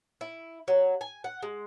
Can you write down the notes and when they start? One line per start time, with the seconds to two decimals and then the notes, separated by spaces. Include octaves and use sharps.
0.21 E4
0.68 F#3
1.01 G#5
1.24 F#5
1.43 G#3